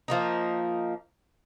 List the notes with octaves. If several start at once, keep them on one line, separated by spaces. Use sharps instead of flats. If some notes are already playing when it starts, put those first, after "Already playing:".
F3 A#3 D#4